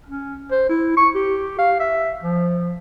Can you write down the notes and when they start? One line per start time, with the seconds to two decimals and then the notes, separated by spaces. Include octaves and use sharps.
0.06 C#4
0.52 C5
0.69 E4
0.97 C#6
1.15 G4
1.58 F5
1.80 E5
2.22 F3